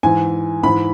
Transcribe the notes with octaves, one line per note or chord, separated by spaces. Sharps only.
G#2 E3 G#5
G#2 E3 B5